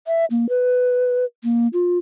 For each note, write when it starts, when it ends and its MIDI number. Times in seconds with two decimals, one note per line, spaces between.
0.07 0.25 76
0.31 0.49 58
0.49 1.25 71
1.44 1.68 58
1.73 1.98 65